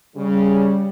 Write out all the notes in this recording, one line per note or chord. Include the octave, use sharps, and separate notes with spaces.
C#3 G3